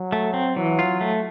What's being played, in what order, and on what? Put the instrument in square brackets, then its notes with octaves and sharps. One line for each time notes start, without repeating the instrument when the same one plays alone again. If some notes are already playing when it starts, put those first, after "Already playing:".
Already playing: [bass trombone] F#3
[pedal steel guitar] A3
C4
[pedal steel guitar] E3 [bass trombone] F#3
[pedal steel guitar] F4
A3